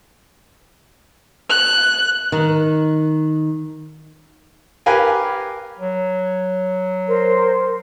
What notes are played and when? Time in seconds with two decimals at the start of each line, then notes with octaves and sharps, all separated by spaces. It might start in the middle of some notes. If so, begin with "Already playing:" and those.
1.50 F#6
2.32 D#3
4.86 G4 A#4 B4 F5 G#5
5.79 F#3
7.07 A#4 C5